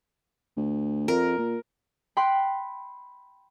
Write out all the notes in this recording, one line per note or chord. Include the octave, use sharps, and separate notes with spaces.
D2
F2 A#4
A#2
G5 B5 C6 F#6